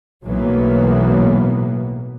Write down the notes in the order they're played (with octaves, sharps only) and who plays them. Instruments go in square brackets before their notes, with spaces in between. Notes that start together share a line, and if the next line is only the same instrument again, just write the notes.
[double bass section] B1 A2 E3 F#3 A#3 B3